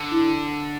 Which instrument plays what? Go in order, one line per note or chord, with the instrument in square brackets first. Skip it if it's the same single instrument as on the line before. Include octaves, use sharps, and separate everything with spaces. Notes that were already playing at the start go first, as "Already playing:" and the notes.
Already playing: [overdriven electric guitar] D3
[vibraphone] E4